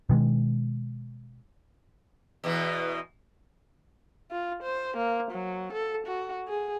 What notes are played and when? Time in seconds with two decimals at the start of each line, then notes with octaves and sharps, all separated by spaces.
0.09 B2 D#3 G#3
2.44 E2 B2 E3
4.31 F4
4.63 C5
4.97 A#3
5.31 F#3
5.73 A4
6.07 F#4
6.48 G#4